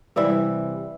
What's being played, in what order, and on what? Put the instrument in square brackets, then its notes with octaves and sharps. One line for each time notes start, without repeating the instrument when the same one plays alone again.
[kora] C3 E3 G3 E4